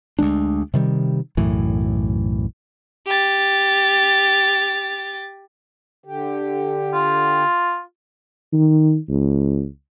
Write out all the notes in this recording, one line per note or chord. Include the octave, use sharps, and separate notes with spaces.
D2 G3 G#3 D4
C3 D#3 G3
B1 F#2 A2 E3
G4 A6
D3 G4
F4
D#3
C#2